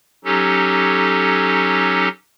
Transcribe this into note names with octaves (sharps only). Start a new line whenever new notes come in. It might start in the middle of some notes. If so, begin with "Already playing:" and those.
F#3 C#4 D#4 G4 A4